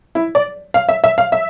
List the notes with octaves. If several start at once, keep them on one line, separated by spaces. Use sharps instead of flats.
E4
D5
F5
E5
E5
F5
E5